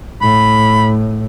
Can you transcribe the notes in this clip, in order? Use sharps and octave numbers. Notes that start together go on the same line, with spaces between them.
A2 B5